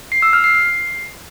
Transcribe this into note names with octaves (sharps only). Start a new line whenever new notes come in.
C7
E6
F6
C7
C7